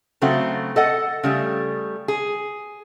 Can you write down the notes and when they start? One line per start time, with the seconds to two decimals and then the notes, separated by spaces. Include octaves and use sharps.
0.22 C#3 F#3 A3 C4 F#4
0.76 A4 D#5 F#5
1.23 C#3 G3 A3
2.08 G#4